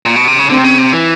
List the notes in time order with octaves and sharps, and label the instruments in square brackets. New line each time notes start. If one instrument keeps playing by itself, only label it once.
[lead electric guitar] A#2
B2
C3
C#3
[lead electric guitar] D3 [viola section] C4
[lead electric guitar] C3
C#3
C3
E3